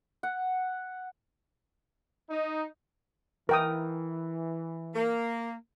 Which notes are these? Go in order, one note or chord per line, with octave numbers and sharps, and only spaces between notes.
F#5
D#4
E3 A#4 G5 D#6
A#3